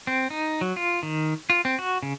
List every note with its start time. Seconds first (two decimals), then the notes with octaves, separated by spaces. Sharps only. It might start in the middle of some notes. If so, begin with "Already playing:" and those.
0.07 C4
0.30 D#4
0.61 F#3
0.76 F4
1.03 D#3
1.50 F4
1.65 C4
1.79 F#4
2.03 C#3